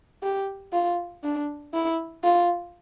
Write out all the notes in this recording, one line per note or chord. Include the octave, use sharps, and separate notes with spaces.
G4
F4
D4
E4
F4